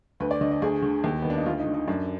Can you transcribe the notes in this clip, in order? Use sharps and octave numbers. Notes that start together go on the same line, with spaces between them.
D2 B4
D5
D3 D#5
D#5
D2 G#4
D3
D#2
D#3 B3
D4
D#4
D2 F4
D#4
D3
D#4
F#2 D4